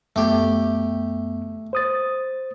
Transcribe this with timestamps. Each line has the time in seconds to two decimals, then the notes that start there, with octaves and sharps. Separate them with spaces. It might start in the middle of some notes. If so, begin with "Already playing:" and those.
0.16 F#2 A3 B3 G4
1.73 C5 D#6 A6